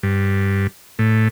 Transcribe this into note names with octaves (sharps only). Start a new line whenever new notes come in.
G2
A2